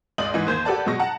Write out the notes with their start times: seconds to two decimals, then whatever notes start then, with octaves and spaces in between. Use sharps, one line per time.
0.18 C#2 D5 D#5 C6 D#6 F#7
0.34 G#2 E3
0.47 D#2 C5 G6 G#6
0.65 F#4 G4 A4 B4 D5 A5
0.86 B2 F#3 G#3 C#6 A#6
0.99 F#5 A5 A#5